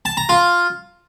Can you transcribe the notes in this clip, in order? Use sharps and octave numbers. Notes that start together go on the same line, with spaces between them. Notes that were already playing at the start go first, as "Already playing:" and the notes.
A5
A#5
F4